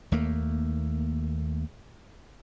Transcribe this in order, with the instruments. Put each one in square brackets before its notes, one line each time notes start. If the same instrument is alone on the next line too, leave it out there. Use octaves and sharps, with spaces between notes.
[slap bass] D#2 A3 A#3